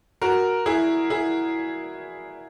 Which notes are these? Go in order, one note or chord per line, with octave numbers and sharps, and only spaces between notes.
F#4 A#4
E4 G#4
E4 G#4